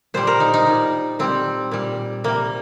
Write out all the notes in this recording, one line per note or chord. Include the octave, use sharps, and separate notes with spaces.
A#2 G3 C5
A#4
D#4
D#4
A#2 G3
A#2 G3 C4
A#2 G3
C3 G3 A#3